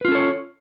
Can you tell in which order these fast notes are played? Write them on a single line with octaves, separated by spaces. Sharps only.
B4 F4 C#4 A4 C#5